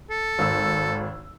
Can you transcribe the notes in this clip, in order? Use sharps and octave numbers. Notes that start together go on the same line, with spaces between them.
A4
G#1 E6